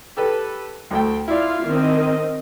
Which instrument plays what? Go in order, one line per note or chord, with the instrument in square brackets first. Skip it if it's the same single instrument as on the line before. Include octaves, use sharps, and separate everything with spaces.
[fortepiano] G4 A4 B4
D2 A3 G5
[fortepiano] E4 D5 [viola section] F4 F5
[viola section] D#3 C4 D#5